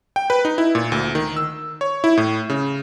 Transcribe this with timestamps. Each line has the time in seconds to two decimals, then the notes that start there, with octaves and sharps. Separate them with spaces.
0.16 G5
0.30 B4
0.45 D#4
0.58 E4
0.75 A#2
0.92 D2
1.15 D#3
1.36 E6
1.81 C#5
2.04 E4
2.17 A2
2.50 C#3